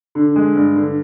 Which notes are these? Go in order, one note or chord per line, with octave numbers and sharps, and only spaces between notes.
D3
G#3
G2
D3